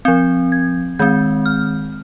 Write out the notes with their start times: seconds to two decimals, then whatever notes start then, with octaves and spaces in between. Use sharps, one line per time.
0.05 F3 C4 G6
0.52 G#6
0.99 D#3 G#3 C4 G6
1.46 F6